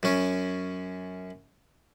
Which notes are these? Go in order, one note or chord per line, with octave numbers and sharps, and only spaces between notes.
F#2 C#4